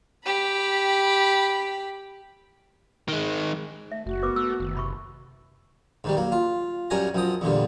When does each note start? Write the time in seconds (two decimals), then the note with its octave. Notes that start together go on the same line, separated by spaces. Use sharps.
0.25 G4 B5
3.08 D#3 G#3
3.92 A3 E5
4.06 F#1 A3 F#4
4.23 B3 A#4 B4 D6
4.36 A3 E6
4.60 F#1 D#3
4.75 C3 A#5 B5 C#6
6.04 G#2 D#3 G3
6.17 F#3 A#3
6.32 F4
6.90 F#2 G3 A#4 C#5 G#5 A#5
7.15 F#2 F3 D#6
7.41 E2 A#2 D3 G3